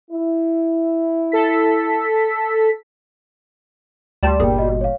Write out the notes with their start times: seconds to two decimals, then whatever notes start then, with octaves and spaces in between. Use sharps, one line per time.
0.11 E4
1.32 A4 B6
4.23 D2 G3 D5 A5 C6 E7
4.40 G1 A#2 G#4 A#4 G5
4.58 F#4 D#5
4.81 C#5 F5